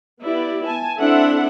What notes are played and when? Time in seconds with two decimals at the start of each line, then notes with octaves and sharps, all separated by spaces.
0.23 B3 E4 G4 D5
0.66 G#5 A5
0.99 C4 D4 E4 A4 E5 F#5